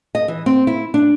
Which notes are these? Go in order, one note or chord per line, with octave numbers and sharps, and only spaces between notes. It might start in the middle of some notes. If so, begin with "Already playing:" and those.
D#5
E3
C4
E4
D4